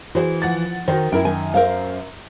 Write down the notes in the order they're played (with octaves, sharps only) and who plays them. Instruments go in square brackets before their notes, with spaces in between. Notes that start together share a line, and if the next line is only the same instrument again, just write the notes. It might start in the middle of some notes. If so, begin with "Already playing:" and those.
[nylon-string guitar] E3 [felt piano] F#4 G#4 C5
[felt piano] F3 F#5 A6
[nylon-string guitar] D#3 [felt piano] F#4 A#4 C5
[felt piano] F#2 [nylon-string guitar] E4 A#4 G5
[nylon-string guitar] D#3 G#5
A#4 C5 F5